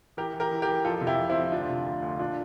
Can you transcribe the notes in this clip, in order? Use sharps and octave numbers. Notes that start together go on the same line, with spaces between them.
E3 G4 A#4
E3
G4 A#4
E3
G4 A#4
E3
F2 F4 A4
C3
E4 G4
F2
C4 E4
F2
D2 D4 F4
C3
D2
D2
A#2 D4 F4